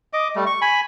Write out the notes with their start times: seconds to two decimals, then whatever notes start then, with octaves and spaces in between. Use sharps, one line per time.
0.13 D#5 D6
0.35 G3 A3
0.46 C#6
0.62 G#5 B5